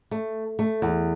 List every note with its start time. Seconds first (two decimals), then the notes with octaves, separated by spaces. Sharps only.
0.11 A3
0.59 A3
0.82 E2